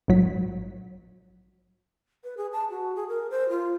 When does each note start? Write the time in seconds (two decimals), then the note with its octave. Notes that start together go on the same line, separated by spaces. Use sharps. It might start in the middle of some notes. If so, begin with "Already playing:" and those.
0.08 A#1 G#2 F#3 B6
2.24 B4
2.37 G#4
2.53 A5
2.70 F#4
2.96 G#4
3.09 A#4
3.31 C5
3.49 F4